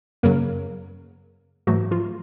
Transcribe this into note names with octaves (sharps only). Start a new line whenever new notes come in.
F#2 C#3 F#3 A#3 A#4
G#2 E3 F#3 A3 F#4
F3 F4